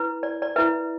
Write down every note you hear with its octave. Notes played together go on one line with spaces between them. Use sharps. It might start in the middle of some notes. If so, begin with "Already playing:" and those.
Already playing: E4 B4
D5
D5
E4 B4 E5